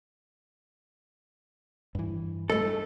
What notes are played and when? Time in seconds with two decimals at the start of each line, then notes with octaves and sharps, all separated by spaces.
1.95 G2 E3
2.50 G2 A3 A4 D#5